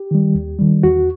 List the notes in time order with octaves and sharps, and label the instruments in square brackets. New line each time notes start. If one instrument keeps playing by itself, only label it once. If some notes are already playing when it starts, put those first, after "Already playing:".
Already playing: [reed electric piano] G4
D#3 G3
D#2
D#3 G3
E2 F#4